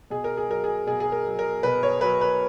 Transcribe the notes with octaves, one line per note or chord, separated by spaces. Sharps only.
B2 G#4
A#4
G#4
F#3 A#4
G#4
B2 G#4
G#4
A#4
F#3
A#4
B2 B4
C#5
F#3 B4
B4